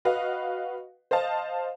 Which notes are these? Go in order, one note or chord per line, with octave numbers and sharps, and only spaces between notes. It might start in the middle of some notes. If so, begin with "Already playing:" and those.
F#4 B4 D#5 F5
C5 D#5 F5 A5